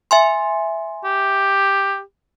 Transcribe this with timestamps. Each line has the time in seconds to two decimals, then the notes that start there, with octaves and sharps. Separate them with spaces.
0.11 E5 G#5 C6
1.05 G4